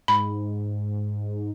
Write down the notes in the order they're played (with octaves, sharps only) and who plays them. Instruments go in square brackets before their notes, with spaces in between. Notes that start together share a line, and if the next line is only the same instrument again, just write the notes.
[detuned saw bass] G#2 [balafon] B5